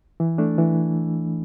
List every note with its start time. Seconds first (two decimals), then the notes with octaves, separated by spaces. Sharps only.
0.20 E3
0.38 A3 D4
0.58 E3